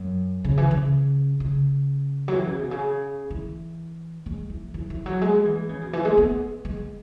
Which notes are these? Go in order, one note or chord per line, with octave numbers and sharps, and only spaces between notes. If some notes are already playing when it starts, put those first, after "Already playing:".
Already playing: F#2
C#3
E3
C#3
C#3
F#3
E3
C#3
B2
C#3
E3
G#3
E3
E3
E3
F#3
G#3
E3
C#3
B2
E3
G#3
B3
G#3